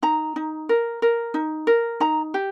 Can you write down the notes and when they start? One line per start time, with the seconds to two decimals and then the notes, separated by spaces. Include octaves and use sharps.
0.03 D#4 A#5
0.36 D#4
0.69 A#4
1.02 A#4
1.34 D#4
1.67 A#4
2.00 D#4 A#5
2.34 G4